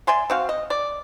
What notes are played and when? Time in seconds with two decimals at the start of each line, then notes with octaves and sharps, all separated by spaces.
0.07 D5 E5 G#5 C6
0.30 C4 F#4 F5
0.49 D#5
0.70 D5